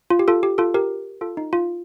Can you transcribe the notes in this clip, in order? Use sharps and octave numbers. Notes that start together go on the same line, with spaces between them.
F4
G4
F4 A4
G4
F4 A4
G4 A#4
F4 A4
D#4
F4